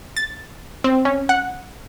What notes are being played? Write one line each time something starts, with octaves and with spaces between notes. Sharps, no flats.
A6
C4
C#4
F#5